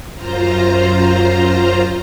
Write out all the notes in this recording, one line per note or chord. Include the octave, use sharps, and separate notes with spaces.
F#2 F4 C5 A#5